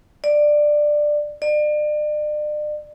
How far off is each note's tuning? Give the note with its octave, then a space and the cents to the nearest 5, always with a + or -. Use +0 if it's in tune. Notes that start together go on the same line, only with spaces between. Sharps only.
D5 +10
D5 +35